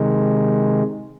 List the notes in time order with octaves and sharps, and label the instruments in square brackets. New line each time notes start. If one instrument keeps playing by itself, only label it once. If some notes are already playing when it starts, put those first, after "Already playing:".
Already playing: [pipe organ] C3 D#3 G#3